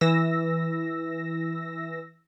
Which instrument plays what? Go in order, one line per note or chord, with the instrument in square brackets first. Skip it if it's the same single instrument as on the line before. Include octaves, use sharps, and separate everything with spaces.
[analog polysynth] E3 E6 A#6